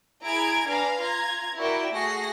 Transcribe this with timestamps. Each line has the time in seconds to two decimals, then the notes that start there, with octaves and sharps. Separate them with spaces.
0.24 E4 G#4 A#5 G#6 D7
0.68 D4 B4 F5 G#5 A#5
1.01 F4 A#5 G#6
1.57 E4 F#4 A#4 D5 E5 G5
1.92 A3 F#4 G#4 A#6 C7